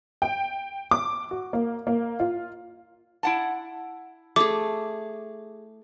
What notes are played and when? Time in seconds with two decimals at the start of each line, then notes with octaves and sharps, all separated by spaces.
0.22 G5
0.91 D6
1.31 F#4
1.53 A#3
1.87 A#3
2.20 F4
3.23 E4 F#5 A5
4.36 A3 G#4 D6